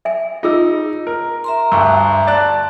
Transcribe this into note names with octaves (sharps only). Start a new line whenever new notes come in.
E5 G#5
D#4 F4 G#4 E6
A#4
E5 A#5 C6
D2 G2 C#6 E6
D5 A5 F#6